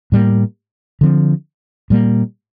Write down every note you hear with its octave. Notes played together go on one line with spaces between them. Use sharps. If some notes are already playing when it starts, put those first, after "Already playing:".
A2 G3 A#3
D3 F3 C4
A#2 G3 A#3